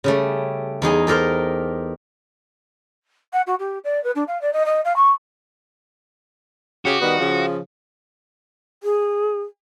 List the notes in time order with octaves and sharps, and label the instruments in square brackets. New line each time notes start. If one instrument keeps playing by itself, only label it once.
[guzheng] C#3 G3 A3
E2 D#4 G#4 G#5
G4 A4 A#4 C5
[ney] F#5
F#4
G4
D5
B4
D4
F5
D5
D#5
D#5
F5
C#6
[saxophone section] C#3 G4 [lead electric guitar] F#4
[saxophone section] D#3 G3 B3
C#3 F3
[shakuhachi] G#4